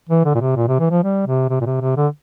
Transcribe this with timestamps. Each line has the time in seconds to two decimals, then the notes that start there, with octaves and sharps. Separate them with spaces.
0.09 E3
0.25 D3
0.35 A#2
0.41 C3
0.56 A#2
0.68 C3
0.80 E3
0.91 F3
1.03 G3
1.27 C3
1.50 C3
1.61 A#2
1.66 C3
1.81 C3
1.97 D3